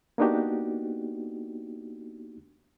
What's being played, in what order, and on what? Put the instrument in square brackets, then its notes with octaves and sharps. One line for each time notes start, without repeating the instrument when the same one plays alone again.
[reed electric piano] A#3 B3 D4 D#4 F#4 G4